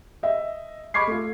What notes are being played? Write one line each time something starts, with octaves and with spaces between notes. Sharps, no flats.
D#5 E5
D#5 B5 C#6 D6 G#6 C7
A3 F4